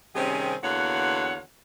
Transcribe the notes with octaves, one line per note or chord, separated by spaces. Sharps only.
C3 D#3 G3 C4 C#4 G#4
E2 D3 A#3 F#4 C#5 F#5